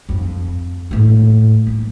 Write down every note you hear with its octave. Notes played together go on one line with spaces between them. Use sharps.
F2
A2 A#3
A#3